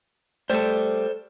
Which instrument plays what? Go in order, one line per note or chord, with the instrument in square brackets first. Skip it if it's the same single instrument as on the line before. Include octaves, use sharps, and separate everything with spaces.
[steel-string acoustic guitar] G3 A3 [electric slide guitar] A4 C5